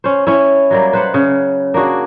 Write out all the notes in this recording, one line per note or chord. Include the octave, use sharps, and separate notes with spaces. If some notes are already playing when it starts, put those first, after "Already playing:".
C#4 C5
C#4 E4
F#3 G3 A#3
B4 C5 F#5
C#3
A#3 D4 F#4 G#4